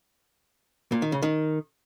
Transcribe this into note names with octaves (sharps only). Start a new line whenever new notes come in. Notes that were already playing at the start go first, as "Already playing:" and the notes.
A#2
D#3
C#3
D#3